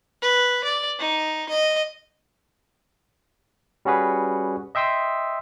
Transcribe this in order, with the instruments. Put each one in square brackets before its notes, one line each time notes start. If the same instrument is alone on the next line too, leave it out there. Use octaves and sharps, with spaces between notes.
[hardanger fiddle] B4
D5
D#4
D#5
[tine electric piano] G3 C#4 F#4 G#4 B4
D#5 E5 G5 C6 D#6 E6